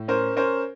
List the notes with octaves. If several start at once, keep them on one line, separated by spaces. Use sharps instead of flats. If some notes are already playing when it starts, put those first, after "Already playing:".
Already playing: A2
C#4 A#4 C5
C#4 A#4 C5